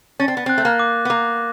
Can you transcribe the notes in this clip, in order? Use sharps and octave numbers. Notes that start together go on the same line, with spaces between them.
C#4 A6
C4
B3
C4 F#6
A3
A#3
D6
B3
A#3 D6